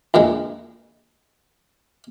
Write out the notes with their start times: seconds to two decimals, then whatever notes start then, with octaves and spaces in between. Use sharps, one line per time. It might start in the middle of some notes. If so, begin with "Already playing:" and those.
0.14 A#1 F2 D3 G#3